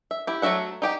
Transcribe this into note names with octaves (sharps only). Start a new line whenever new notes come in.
E5
E4 G4
F#3 A3 F#4 E5 F#5
D#4 G4 G5